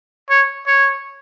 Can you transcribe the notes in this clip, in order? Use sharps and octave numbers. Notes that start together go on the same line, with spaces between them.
C#5
C#5